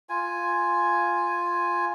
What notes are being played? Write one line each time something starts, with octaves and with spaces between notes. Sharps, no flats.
F4 G#5